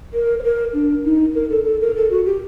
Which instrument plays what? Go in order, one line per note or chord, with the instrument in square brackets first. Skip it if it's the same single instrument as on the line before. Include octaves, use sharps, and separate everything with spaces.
[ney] A#4
C5
A#4
D4
D#4
A#4
A4
A4
A#4
A4
F#4
G4